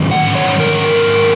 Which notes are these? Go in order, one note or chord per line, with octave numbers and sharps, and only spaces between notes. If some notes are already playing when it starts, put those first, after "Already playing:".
Already playing: G#2 D#3 F#3 C#4
F#5
C#5
A#4